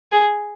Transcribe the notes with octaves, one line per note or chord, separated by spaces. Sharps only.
G#4